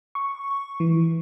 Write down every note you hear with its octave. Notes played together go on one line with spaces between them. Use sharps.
C#6
E3